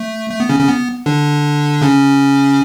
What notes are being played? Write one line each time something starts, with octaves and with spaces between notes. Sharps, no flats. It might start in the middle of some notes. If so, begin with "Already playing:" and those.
Already playing: A3
A3
B3
C#3 C#4
C#3 C#4
B3
D3 D4
C#3 C#4